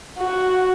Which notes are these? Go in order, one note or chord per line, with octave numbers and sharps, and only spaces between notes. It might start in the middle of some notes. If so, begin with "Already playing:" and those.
F#4